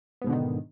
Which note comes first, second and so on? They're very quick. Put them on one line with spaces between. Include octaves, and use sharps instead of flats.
B3 G#2 B2 D3 D#3